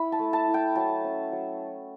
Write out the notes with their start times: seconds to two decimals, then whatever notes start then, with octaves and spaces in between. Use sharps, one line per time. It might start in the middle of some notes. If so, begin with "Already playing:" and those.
Already playing: E4 B5
0.12 A5
0.19 A3
0.33 A5
0.48 E4
0.54 G5
0.75 F#3 A5
1.04 C#4
1.32 F#3